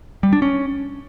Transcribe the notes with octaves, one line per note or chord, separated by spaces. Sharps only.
G3
D4
C#4